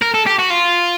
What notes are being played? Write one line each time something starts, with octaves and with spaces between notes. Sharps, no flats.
A#4
A4
G4
F#4
F4